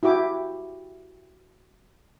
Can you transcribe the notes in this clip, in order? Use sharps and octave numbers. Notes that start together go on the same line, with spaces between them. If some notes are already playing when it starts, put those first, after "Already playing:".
E4 F#4 G4 D6